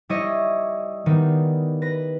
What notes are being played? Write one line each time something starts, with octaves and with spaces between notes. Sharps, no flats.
G3 E4 C#5 D#5
D#3 G3 B3
B4 A#6